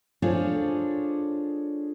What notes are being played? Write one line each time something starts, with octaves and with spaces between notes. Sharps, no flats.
D4 F4 G#4 A4 C5 C#5